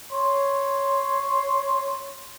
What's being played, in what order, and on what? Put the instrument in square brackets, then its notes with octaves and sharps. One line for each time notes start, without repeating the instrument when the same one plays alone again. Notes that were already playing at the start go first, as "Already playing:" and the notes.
[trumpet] C#5 [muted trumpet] C6